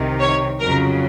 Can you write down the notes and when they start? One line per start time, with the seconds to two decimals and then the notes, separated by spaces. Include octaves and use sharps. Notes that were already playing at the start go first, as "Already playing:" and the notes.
Already playing: C2 C3 D#3
0.20 C#5
0.60 F2 C#3 F#3 A#4